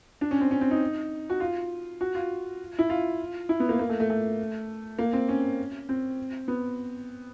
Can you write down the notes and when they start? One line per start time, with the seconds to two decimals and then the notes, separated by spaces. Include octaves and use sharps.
0.21 D4
0.31 C#4
0.41 C4
0.51 C#4
0.61 C4
0.71 D#4
1.30 F#4
1.40 F4
2.01 F#4
2.15 F4
2.79 E4
2.90 F4
3.49 E4
3.60 B3
3.69 A#3
3.79 A#3
3.89 A3
4.00 A3
4.10 A3
4.99 A#3
5.13 C4
5.29 C#4
5.89 C4
6.48 B3